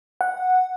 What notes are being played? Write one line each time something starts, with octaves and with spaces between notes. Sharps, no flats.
F#5